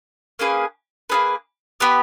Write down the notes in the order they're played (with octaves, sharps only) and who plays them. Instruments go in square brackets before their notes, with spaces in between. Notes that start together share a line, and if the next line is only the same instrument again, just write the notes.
[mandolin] A#3 C#4 G#4 B4
A#3 C#4 G#4 B4
B3 G4 B4